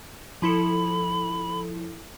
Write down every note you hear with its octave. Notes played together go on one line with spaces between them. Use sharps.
F3 E4 A4 B5